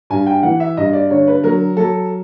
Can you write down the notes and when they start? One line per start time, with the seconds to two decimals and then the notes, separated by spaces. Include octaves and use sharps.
0.10 G2 G#5
0.27 G5
0.43 E3 F#5
0.60 E5
0.77 G2 D#5
0.93 D5
1.10 D3 C#5
1.27 B4
1.44 F#3 A#4
1.77 F#3 A4